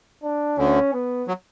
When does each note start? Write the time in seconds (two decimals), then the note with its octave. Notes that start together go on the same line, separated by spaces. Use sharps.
0.23 D4
0.58 D2 D3 C#4
0.93 B3
1.28 F#3